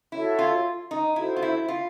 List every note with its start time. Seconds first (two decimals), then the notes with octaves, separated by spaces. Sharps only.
0.12 E4 F#4 A4 C#5 E5
0.39 F4
0.91 D#4
1.16 E4 F#4 A4 C5
1.37 F4
1.42 E4
1.68 F4